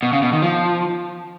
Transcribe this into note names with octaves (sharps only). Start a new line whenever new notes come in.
B2
C#3
B2
D#3
F3